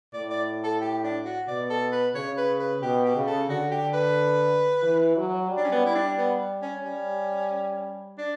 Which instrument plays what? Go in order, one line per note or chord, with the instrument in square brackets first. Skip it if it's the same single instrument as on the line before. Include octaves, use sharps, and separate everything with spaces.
[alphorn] A2 [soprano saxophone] D5
[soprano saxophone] D5
A4
G4
D4
F#4
[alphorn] B2 [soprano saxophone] D5
[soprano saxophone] A4
B4
[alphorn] C#3 [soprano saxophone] C#5
[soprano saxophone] B4
B4
[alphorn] B2 [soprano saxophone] G4
[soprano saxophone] G4
[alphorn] C#3
[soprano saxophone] A4
[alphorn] D3 [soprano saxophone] F#4
[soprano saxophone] G4
B4
[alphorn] E3
F#3
G3
[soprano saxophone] D4
C#4
B3
E4
D4
B3
C#4
[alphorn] G3 [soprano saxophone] C#4
[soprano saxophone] D4